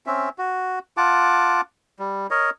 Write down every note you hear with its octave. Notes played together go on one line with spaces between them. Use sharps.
C4 C#4 E5
F#4
F4 F#5 A5 D6
G3
A#4 C#5 D#5